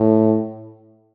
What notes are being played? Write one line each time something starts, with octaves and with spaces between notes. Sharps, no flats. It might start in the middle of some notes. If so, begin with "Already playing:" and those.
Already playing: A2